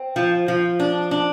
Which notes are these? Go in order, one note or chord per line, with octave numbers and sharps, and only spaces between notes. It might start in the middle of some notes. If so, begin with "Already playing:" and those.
Already playing: C4
F3
F3
D4
D4